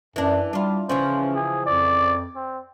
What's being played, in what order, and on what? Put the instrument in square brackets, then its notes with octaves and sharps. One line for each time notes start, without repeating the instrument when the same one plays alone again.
[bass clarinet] F#2 [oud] E3 D4
[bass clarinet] G3 [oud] D4 F4
[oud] C#3 E3 F3 [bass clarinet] C#4 [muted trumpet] C5
[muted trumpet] G#4
[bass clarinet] F2 [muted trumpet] D5
[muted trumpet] C4